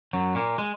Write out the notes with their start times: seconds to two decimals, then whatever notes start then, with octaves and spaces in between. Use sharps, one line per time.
0.13 F#2 F#3
0.35 A#2 A#3
0.58 G#3